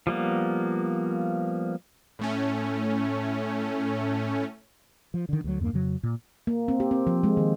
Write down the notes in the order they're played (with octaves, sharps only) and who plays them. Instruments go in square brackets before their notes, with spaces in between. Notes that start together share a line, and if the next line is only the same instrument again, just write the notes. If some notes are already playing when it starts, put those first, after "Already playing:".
[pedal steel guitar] F3 G3 A#3 B3
[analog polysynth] A2 A3 C#4
[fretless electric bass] F3
D3 D#3
D2 F#3
E2 G2 G#3 A#3
F2 C#3 F#3
A#2
[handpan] A#3
C4
G4
C4
F3
G#3
D#3